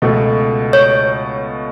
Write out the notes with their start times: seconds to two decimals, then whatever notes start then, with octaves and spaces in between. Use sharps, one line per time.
0.02 C#2 B2 A3
0.73 C#5